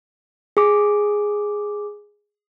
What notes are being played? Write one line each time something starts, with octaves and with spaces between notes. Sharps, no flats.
G#4 D6